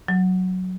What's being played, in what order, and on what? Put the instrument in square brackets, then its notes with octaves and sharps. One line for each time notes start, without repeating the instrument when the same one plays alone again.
[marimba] F#3